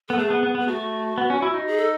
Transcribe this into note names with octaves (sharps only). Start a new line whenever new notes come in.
B3 A4
A3 G#4
B3
B3
B3
G#4
A3 F#4
B3
C#4
E4
D#4
G#4
A4